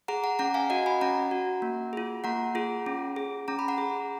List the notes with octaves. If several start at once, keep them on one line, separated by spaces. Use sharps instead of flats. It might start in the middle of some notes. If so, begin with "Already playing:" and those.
G#4 F#5 A#5
F#5 A#5
C#4 F#5 A#5
F5 G#5
F#4 D#5 F#5
G#5 B5
C#4 F#5 A#5
F#4
A#3
F4 G#4
A#3 F#5 A#5
F4 G#4
C#4
G#4
C#4 A#5
B5
F#5 A#5
G#4